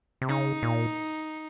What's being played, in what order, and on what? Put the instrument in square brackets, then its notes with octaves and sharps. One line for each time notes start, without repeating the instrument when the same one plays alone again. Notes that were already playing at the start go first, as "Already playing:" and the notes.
[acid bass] C3
[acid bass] C#3 [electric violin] D#4
[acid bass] A#2